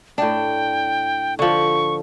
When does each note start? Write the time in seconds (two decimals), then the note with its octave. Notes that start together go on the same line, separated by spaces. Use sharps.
0.18 A2 D4 G5
1.39 D3 F3 C#6